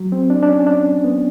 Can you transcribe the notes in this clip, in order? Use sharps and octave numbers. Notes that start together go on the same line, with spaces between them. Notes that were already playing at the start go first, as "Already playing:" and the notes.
Already playing: F#3
C4
D4
D4
C#4
D4
B3